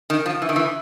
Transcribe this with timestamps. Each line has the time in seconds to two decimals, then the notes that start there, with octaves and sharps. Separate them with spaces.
0.10 D#3
0.26 F3
0.42 E3
0.49 D#3
0.56 E3